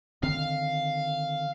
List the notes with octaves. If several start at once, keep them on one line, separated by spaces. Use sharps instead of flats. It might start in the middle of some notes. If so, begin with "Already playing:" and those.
D3 D#3 C4 F5